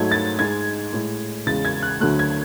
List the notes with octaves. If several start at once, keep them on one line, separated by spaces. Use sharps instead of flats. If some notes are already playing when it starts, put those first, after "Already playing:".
Already playing: G#2 F#3 A3 G#6
A6
G#2 G#3 G#6
A2 G#3
E2 C#3 G#3 A6
G#6
F#6
D2 D3 F#3 A3 F#6
G#6